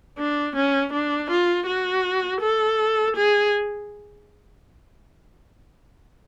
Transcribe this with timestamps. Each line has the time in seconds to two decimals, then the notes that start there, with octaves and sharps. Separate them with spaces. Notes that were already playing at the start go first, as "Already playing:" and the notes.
0.18 D4
0.56 C#4
0.93 D4
1.30 F4
1.67 F#4
2.41 A4
3.16 G#4